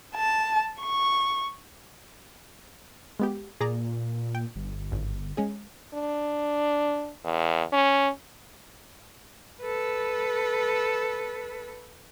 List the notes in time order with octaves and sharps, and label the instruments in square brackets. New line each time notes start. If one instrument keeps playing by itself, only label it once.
[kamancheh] A5
C#6
[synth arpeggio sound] G#3 B3 G4
[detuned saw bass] A#2 [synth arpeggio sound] G#4 D5 A#5
[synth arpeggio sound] G5
[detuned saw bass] G1
[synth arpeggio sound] G#1
G#3 C#4 G#4
[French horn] D4
E2
C#4
[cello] A4 B4